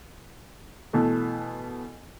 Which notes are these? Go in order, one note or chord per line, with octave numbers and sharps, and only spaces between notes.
B2 E3 A3